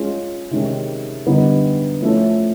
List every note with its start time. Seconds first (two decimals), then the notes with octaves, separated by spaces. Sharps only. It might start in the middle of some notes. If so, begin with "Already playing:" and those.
Already playing: G#3 C#4 F4 G#4
0.51 C3 D#3 G#3 C#4
1.27 D3 G3 B3 D#4
2.01 F3 A3 C#4 E4 A4